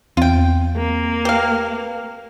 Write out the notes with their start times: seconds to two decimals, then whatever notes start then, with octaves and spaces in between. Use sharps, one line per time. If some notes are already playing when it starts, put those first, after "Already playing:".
0.17 E2 C4 F4 G5
0.77 A#3
1.25 G4 B4 F5